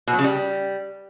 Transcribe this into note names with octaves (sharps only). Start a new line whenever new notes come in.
B2
F#3
C#3
G3